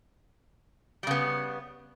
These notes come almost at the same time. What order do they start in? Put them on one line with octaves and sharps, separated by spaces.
G3 C#3 B3